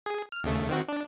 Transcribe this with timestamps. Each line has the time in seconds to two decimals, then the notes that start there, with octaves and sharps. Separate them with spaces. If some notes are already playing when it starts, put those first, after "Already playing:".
0.06 G#4
0.32 F6
0.44 D#2 C#3 A3
0.69 D#3 C4 F#4
0.88 D4